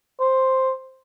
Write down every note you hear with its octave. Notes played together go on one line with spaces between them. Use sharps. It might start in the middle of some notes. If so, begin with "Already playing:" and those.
C5